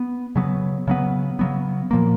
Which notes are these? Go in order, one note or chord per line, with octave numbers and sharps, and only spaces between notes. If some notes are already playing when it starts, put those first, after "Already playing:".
Already playing: B3
C#3 F#3 B3
C#3 F#3 B3
C#3 F#3 B3
A#2 F3 A#3